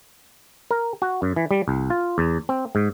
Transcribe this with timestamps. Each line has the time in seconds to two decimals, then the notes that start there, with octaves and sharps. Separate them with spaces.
0.71 A#4
1.02 F#4
1.22 F#2
1.36 E3
1.51 G3
1.68 C2
1.90 F4
2.18 E2
2.49 C4
2.75 G#2